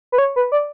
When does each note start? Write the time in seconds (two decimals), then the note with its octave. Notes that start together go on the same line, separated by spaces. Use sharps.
0.12 B4
0.18 C#5
0.36 B4
0.52 D5